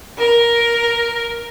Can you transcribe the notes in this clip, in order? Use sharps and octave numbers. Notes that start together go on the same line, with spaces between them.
A#4